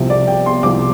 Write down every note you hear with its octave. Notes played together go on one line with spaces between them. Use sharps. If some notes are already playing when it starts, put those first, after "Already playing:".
Already playing: C2 C3 F3
D5
G5
C6
C2 C3 F3 D6